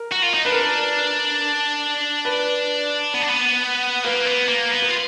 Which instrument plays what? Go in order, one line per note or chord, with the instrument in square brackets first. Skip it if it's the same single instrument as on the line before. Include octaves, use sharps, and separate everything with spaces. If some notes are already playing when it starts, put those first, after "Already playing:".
Already playing: [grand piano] A#4
[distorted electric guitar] F#4
F4
D#4
[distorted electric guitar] D4 [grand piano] B4
[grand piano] A#4
B4
B4
[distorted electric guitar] B3
D4
B3
[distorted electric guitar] A#3 [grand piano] B4
[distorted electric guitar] B3
A#3
B3
[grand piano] B4
[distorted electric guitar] F4